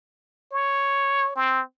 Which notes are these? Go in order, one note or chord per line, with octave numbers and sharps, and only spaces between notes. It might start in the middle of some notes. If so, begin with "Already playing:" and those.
C#5
C4